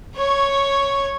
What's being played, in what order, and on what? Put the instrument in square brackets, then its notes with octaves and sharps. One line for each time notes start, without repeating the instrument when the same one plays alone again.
[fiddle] C#5 C#6